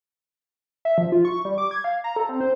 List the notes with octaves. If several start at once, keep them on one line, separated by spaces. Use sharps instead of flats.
E5
F3
F4
C#6
G3
D6
G#6
F5
A#5
A4
C4
C5